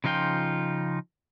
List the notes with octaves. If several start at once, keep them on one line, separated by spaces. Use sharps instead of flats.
C#3 F3 D#4 F4 G5